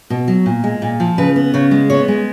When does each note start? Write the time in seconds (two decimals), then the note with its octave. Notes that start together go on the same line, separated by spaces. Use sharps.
0.10 B2
0.28 F#3
0.46 A#2
0.64 G#3
0.82 A#2
1.00 F3
1.18 C#3 B4
1.36 B3
1.54 C#3 C#5
1.71 G#3
1.90 B3 C#5
2.08 G#3